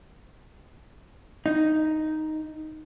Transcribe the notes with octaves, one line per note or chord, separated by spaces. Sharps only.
D#4